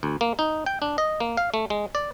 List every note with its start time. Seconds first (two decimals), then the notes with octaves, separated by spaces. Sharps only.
0.03 D2
0.21 A#3
0.39 D#4
0.66 G5
0.82 D4
0.98 D#5
1.20 A#3
1.37 F5
1.54 A3
1.70 G#3
1.95 D5